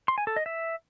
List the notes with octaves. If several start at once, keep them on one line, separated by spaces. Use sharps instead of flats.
C6
G#5
A4
D#5
E5